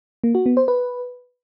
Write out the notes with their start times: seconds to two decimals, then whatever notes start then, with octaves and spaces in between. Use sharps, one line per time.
0.24 A#3
0.35 F#4
0.46 B3
0.57 C5
0.68 B4